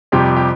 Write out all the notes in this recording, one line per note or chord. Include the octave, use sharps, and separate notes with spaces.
F2 C3 G3 C4 G4
G4